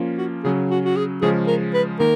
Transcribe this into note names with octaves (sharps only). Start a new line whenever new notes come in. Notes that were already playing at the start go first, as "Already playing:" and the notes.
Already playing: F3 A#3 C#4 F4
F#4
C#3 F#3 C#4 G#4
F#4
F#4
G#4
C#3 F3 G#3 C#4 G#4
A#4
B4
D#3 A#3 A#4